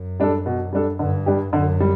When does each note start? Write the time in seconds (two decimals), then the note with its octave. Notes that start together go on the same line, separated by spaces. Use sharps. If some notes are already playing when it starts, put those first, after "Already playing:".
Already playing: F#2
0.20 G3 D4 A4
0.46 B2
0.73 G3 D4 A4
0.99 G2 D3
1.26 G3 D4 G4
1.53 F#2 D3
1.80 G3